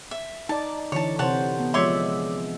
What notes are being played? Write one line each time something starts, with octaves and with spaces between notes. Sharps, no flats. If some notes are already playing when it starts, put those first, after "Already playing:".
E5
D#4 D5 A5
D3 E3 C#5 A5
C3 C5 C#5 F#5 A5
B3
F3 G#3 C#5 D5 E5 C6